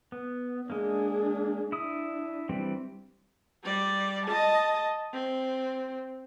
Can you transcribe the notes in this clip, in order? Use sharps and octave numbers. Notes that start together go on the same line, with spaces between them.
B3
G#3 A#3 D4 G#4
D4 E4 D#6
E3 G3 C4
G3 D5
D#5 A5
C4